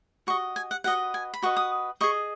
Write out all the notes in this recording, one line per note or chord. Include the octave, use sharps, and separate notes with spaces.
F#4 D#5 C#6
G#5
F#5
F#4 B4 D#5 F#5
G#5
B5
F#4 B4 D#5 C#6
D#6
G#4 D#5 C#6